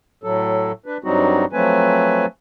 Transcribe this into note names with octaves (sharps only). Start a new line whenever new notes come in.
A2 F#3 A4
D4 B4
G2 F#3 G3 C4 D#4 F#4
F3 F#3 A3 C4 B4 G#5